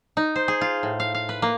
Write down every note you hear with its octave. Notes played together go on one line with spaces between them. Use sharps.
D#4
C5
G#4
F4
A2
F5
F5
B4
A#3